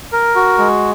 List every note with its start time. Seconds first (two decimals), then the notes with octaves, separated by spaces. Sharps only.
0.13 A#4
0.36 F#4
0.58 G#3